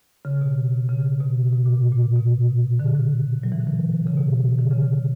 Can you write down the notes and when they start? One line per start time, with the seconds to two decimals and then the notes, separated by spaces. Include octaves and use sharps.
0.25 C#3
0.41 B2
0.89 C#3
1.20 B2
1.53 B2
1.66 A#2
1.92 A#2
2.16 B2
2.80 D3
2.87 C#3
2.94 D3
3.43 F#3
3.52 E3
3.60 D3
3.67 E3
4.07 C#3
4.18 B2
4.28 B2
4.58 D3
4.71 C#3